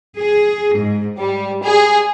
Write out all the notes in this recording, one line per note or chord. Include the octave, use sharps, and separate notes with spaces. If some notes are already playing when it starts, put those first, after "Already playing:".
G#4
G#2
G3
G#4